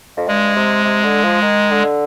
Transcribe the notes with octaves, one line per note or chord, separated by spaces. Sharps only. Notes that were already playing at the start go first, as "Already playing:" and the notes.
F2
G2 G#3
C3
C3
D3
F3
D#3
D3